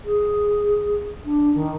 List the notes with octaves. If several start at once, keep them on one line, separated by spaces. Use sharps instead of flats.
G#4
D4
D#3